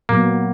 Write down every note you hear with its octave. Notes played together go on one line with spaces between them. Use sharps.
A#2 F#3 A#3 B3